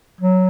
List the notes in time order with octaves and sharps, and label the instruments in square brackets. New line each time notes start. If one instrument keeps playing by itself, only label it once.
[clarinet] F#3